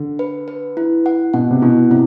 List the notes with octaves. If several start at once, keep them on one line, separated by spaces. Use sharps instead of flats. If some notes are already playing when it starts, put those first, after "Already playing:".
Already playing: D3
B4
B4
E4
F#5
B2 F#5
C3
B2 E4
C3 E4